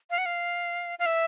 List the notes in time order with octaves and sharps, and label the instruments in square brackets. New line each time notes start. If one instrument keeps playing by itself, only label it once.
[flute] F5
F#5
F5
F5
E5